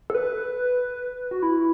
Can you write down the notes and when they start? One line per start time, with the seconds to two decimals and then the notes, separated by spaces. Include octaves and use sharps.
0.10 A4
0.15 B4
1.31 F#4
1.42 E4